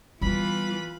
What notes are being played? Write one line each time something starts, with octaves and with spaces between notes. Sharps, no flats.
E3 G3 B3 F4 B4 B5